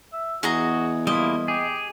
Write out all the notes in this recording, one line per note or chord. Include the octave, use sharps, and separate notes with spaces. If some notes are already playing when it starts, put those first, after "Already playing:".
E5
E2 F#4 G#4 D#5 A#5
F3 G3 A#3 E4 D#5
G4 G#4